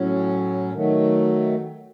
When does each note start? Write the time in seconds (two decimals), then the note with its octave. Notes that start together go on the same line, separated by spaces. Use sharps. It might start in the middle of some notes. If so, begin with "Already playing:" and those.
Already playing: A2 F#3 C#4
0.73 D#3 F#3 A3